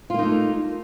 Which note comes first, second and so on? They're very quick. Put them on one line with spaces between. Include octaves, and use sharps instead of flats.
F4 A#3 D#4 A3